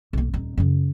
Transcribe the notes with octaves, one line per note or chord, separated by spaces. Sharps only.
B1 A#3
D#1 D#4
F#2 C#3